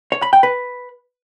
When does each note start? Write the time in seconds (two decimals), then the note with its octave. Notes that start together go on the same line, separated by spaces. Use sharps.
0.12 C#5
0.22 B5
0.33 G5
0.43 B4